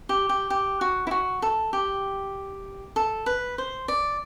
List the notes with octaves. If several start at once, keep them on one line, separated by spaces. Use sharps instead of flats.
G4
G4
G4
F#4
E4
F#4
A4
G4
A4
B4
C5
D5